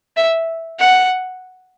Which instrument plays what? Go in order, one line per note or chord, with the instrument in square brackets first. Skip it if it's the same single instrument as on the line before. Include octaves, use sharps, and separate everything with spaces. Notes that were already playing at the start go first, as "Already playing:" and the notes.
[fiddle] E5
F#5